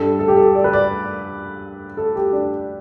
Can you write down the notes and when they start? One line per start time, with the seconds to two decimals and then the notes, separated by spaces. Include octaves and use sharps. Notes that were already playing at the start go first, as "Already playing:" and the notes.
Already playing: G2 G3 A4
0.19 A4
0.28 G4
0.37 A4
0.55 D5
0.64 B4
0.73 D5
1.97 A4
2.16 G4
2.33 D4